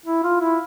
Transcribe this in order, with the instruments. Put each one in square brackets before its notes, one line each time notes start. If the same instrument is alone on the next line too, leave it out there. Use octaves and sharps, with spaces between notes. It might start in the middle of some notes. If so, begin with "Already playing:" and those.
[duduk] E4
F4
E4